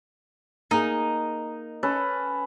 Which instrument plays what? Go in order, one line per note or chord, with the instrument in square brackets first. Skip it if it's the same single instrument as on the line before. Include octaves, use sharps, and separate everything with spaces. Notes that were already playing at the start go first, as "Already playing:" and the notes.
[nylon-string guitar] A#3 G#4 [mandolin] D#4
[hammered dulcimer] C#4 A4 B4